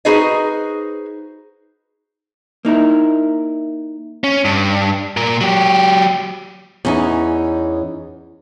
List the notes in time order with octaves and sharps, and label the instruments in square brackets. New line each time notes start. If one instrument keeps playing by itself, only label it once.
[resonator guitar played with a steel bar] D#4 F#4 G#4 B4 C5 D#5
[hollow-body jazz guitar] A#3 D#4 E4 A#4
[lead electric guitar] C#4
G2
A#2 A#4
F#3 G4
[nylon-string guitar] E2 C#4 D#4